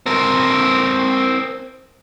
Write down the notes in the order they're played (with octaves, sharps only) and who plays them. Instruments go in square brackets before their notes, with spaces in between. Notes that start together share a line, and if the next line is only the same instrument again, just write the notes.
[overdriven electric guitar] C4 A#4